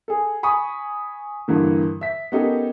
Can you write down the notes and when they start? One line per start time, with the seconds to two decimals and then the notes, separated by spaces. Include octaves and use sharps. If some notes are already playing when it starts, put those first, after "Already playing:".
0.08 G#4 A4
0.43 G#5 B5 C#6 D#6
1.48 G2 D3 E3 A#3
2.01 E5 B6
2.32 B3 C#4 D#4 G4 A4 A#4